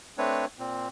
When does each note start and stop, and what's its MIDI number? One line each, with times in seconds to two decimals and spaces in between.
0.18 0.45 57
0.18 0.45 60
0.18 0.45 62
0.18 0.45 71
0.18 0.45 73
0.59 0.88 46
0.59 0.88 60